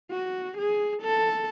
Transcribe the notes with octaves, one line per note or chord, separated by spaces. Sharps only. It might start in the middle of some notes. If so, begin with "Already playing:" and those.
F#4
G#4
A4